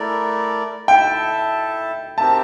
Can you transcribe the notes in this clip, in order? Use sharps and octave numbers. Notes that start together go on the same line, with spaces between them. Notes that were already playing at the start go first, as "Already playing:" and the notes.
Already playing: A3 E4 A#4 D5
E4 A4 E5 G5 A5
C4 G4 A#4 E5 A5